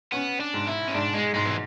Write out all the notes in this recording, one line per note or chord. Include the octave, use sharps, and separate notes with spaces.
B3 C#4
D4
G#2
E4
C#4
G#2 D4
G#3
G#2 G#3
E3